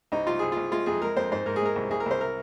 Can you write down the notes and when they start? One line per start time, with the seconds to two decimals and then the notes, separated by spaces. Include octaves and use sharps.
0.12 C2 D#4
0.27 C2 F4
0.39 C2 G#4
0.52 C2 F4
0.71 G#3 F4
0.86 F2 G#4
1.01 G#3 A#4
1.16 F2 C5
1.31 G#2 C5
1.46 G#2 A#4
1.56 G#4
1.61 G#3 A#4
1.76 C2
1.91 C2 G#4
2.00 A#4
2.06 C2 C5
2.21 A#4